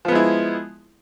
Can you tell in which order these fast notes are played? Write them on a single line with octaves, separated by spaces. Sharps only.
F3 B3 G#3 E4